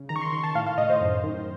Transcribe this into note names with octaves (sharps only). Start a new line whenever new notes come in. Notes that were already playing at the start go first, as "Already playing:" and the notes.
Already playing: C#3
D#3 A#5
C#6
C6
D#3 C6
A5
A2 F5
F5
A2 D#5
C5
F#2
D#3